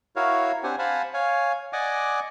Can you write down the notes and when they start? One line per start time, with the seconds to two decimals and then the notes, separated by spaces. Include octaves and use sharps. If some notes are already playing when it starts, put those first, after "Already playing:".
0.16 E4 F#4 A#4 C#5 F5
0.64 C4 D4 G4 C5 F#5 G#5
0.79 C5 F5 F#5 G#5 A5 B5
1.14 C#5 F5 G#5
1.73 D5 D#5 F#5 G#5 D6